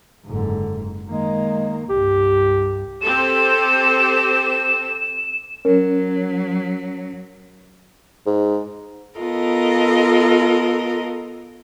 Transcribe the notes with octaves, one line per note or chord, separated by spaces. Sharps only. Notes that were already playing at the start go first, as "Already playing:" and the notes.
F#1 G#2 D3
D#3 G#3 A#3
C2 G2 G4
C4 G4 A4 E7
F#3 C#4 A#4
G#2
B3 F4 A4 A#4 D#5